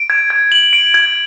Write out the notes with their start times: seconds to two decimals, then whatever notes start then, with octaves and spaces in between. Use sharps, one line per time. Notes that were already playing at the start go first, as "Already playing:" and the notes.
Already playing: D7
0.10 G#6
0.30 G#6
0.52 F#7
0.73 D7
0.94 G#6